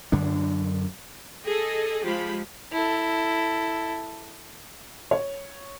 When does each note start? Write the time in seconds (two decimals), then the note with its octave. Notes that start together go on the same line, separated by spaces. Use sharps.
0.12 F#2 D3 D4
1.47 G#4 A4 D#5
2.05 F3 G#3 F4 G4 B5
2.73 E4 A4
5.11 C#5